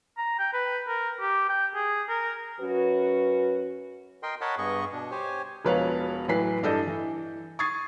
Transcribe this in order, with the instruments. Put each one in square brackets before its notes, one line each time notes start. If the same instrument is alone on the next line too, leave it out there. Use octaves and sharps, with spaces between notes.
[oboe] A#5
G5
B4
A#4
G4
G5
G#4
A#4
[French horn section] F#2 C#4 F#4 B4
[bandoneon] A#4 D#5 G5 C6
A#4 C#5 D#5 F#5 A5 B5
G2 B3 G#4 D#5 C#6
B2 D4
G4 C5 C#5 G#5
[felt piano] E1 B2 F3 B4 C#5 F5
A2 E3 F#3 B4 B6 C7
G2 D4 E4 A4 D#5 G6
E3
C#6 D#6 G#6 A6 C7